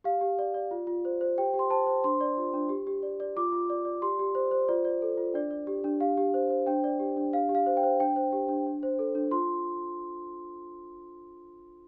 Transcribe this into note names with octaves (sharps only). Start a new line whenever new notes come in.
G4 F5
G4
D5
D5
F4
F4
C5
C5
G4 G5
G4
C6
C5 A5
C5
D4 C6
D5
F4
D4
G4
G4
D5
D5
F4 D6
F4
D5
D5
G4 C6
G4
C5
C5
F4 D5
D5
A4
F4
D4 D5
D5
G4
D4
G4 F5
G4
C5
C5
D4 G5
D5
G4
D4
G4 F5
G4
F5
C5
G5
C5
D4 G5
C5
G4
D4
D4
C5
A4
D4
F4 C6